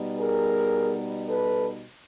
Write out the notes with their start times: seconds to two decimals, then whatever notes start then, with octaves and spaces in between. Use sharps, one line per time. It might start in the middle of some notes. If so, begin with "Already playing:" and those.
Already playing: B2 G3 B3 D#4
0.17 G#4 A#4
1.27 A4 B4